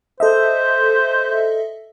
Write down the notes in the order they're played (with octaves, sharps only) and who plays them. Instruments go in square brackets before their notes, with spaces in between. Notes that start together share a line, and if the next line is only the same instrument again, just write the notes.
[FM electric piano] A4 D#5 E5 [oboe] C5